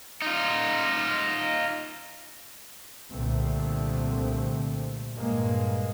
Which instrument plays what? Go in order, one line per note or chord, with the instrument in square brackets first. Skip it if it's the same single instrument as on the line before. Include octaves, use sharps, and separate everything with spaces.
[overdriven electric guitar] D#4 F4
[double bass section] C2 A#2 D3 A3 C4
G2 A#2 G#3 A#3